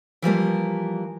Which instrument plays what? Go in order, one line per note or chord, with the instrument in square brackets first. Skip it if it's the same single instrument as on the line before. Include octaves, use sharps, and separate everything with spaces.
[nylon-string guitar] E3 F3 G3 A#3